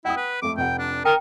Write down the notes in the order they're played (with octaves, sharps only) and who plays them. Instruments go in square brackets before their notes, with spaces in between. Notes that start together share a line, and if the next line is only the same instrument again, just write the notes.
[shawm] E4 [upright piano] F#5 G5 D#6
[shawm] B4
[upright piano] F2 A3 [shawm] D6
[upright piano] F1 F#5 [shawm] G5
[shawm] D4
[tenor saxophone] A#4 [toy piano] G5 [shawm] D#6